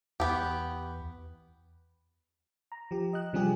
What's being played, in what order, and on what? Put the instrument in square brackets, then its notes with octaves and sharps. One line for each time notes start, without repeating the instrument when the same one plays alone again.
[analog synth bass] E2 [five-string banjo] B3 G4
[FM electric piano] A#5
F3 G4
D#5 F#6
C3 F3 G3 D4 G4 G#4